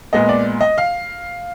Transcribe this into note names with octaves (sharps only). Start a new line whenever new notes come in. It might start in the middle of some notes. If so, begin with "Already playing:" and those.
A#2 G#3 B3 D#5
D5
D#5
F5